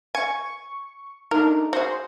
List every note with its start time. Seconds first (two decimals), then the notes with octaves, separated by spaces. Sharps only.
0.15 G#5 C#6
1.31 A3 D4 D#4 A#4
1.73 F#4 G#4 C5